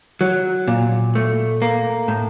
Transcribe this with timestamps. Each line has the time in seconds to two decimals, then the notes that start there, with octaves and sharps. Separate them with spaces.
0.21 F#3
0.68 A#2
1.15 A3
1.62 A#3
2.08 A2